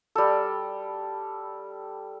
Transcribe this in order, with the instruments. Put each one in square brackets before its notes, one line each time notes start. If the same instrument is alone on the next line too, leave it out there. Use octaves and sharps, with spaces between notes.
[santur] G3 A4